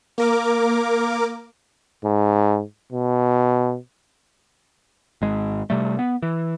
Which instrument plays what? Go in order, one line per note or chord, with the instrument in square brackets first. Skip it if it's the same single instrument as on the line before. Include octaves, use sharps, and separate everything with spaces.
[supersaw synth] A#3 A#4 D6
[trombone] G#2
B2
[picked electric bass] G#1 G#3
C3 G3 A3
B3
E3